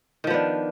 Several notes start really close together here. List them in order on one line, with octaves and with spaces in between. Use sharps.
D#3 F3 B3 D4